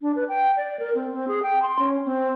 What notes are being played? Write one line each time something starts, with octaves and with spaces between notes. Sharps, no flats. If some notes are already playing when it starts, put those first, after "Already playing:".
D4
B4
G5
D5
A#4
C4
C4
G#4
G5
C6
C#4
C4